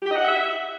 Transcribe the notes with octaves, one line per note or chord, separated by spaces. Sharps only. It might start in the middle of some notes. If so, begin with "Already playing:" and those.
G4
D#5
F#5
E5